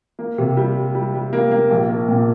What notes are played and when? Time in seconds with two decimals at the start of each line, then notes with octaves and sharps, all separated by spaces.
0.19 A#3
0.38 C3
0.57 G3
0.76 G3
0.95 G3
1.14 G3
1.33 A#3
1.51 A#3
1.70 A#1
1.89 A#3
2.08 A#2